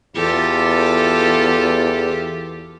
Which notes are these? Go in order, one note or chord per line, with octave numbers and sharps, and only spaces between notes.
E2 F4 G4 A4